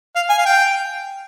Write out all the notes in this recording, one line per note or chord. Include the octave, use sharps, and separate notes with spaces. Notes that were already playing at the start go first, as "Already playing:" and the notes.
F5
G#5
F5
G5